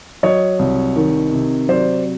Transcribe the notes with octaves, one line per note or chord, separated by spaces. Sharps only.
F#3 C#5 D#5
C2
D#3
C3
F#3 C5 D5